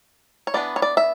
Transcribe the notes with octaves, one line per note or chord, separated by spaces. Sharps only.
C#5
E3 B3 D4 D5
C#5
D5
E5